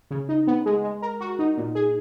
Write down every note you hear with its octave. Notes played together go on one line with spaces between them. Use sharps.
C#3
D#4
B3
G#3
G#3
A#4
F#4
D#4
A#2
G#4